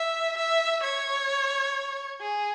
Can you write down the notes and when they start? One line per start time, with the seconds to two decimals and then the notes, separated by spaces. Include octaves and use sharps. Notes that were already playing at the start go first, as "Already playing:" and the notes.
Already playing: E5
0.38 E5
0.83 C#5
2.20 G#4